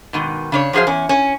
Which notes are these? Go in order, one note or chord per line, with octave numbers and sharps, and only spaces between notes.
G#2 B2 D#3
C#3 D4 C#5
F3 F#3 G#4 C5 F5
E2 C#4
C#4